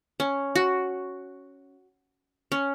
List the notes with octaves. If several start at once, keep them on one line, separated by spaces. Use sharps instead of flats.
C#4
F#4
C#4